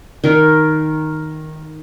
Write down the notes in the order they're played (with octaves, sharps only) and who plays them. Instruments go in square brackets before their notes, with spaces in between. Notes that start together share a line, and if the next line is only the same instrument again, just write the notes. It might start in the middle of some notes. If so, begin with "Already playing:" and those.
[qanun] D#3 A#4